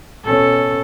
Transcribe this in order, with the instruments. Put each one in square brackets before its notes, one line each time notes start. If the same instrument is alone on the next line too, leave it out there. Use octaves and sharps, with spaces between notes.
[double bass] B2 C#4 [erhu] A4